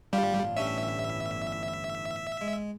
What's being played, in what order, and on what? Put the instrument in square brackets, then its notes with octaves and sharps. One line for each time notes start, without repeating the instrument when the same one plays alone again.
[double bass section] G1 A2 E3 [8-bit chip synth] G3 [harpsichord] D4 F4
[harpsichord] C#4 D4 G4 [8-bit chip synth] E5
[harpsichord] G#3